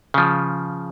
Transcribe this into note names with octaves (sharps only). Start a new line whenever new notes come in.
C#3 F3